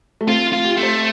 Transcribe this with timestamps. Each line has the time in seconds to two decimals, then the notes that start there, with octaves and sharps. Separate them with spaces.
0.21 A3
0.27 C4 F4
0.53 F4
0.64 G4
0.77 A3
0.83 C5